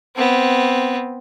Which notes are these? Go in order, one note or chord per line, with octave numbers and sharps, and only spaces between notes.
B3 C4